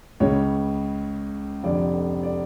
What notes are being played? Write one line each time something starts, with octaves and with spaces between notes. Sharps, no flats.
C#2 C#3 C#5
F1 F2 D3 D5
D5